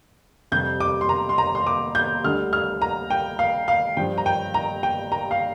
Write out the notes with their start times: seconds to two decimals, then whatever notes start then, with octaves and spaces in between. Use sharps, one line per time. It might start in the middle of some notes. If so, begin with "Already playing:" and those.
0.52 F2 C3 G3 G6
0.80 D6
1.01 C6
1.09 A#5
1.29 C6
1.38 A#5
1.55 C6
1.67 D6
1.95 G6
2.24 D2 D3 G3 F6
2.53 F6
2.82 A#5
3.10 G5
3.39 F5
3.68 F5
3.97 G2 F3 G5
4.18 A#5
4.26 G5
4.54 A#5
4.83 G5
5.12 A#5
5.31 F5